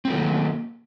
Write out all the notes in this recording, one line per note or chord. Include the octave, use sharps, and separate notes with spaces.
D#3 F#3 A3 A#3 C4